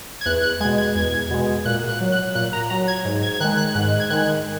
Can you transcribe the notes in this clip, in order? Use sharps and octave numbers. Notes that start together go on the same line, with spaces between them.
G#6
E2 F#6
F#6
B2 G#3 G#6
G#6
E2 G#6
B2 G#3
A#2 F#6
F#6
F#3
F#6
A#2 F#6
A#5
F#3 A#5
G#6
G#2
G#6
G#6
D#3 G#3 F#6
F#6
G#2 F#6
G#6
D#3 G#3 F#6